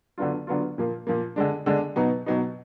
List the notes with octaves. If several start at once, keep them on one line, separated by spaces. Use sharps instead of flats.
D3 F#3 B3 D4 F4
D3 F#3 B3 D4 F4
A#2 F3 A#3
A#2 F3 A#3
D3 G#3 D4
D3 G#3 D4
B2 F#3 B3 D#4
B2 F#3 B3 D#4